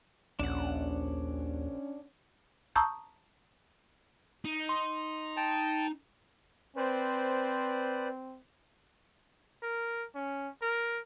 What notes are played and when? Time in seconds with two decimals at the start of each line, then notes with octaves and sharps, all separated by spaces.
0.39 A#1 D#2 C#4 D4 F#5
2.75 A5 A#5 C#6 D#6 E6 G6
4.45 D#4
4.69 C6
5.37 G5 A5
6.77 C4 B4 C5 D5
9.62 A#4
10.15 C#4
10.62 A#4